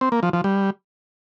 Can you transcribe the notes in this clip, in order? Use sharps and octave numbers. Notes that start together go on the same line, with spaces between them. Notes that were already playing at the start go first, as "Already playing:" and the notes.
C4
A#3
F3
F3
G3